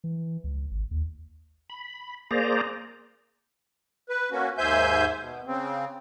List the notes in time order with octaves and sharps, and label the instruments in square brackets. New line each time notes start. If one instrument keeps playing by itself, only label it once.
[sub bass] E3
C#2
G#1
D#2
[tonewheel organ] B5
A#3 G#4 C5 D5 A#5
[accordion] B4
A#3 C#4 F#4
D#2 G#2 C5 E5 G#5 G6
B2
C#3 C4